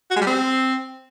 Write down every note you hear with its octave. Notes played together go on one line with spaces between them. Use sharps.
F#4
G#3
G3
C4